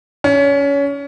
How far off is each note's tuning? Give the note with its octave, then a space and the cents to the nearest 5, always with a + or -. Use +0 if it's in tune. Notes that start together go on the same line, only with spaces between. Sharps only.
C#4 +25